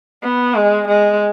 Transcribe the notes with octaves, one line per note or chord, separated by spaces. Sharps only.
B3
G#3
G#3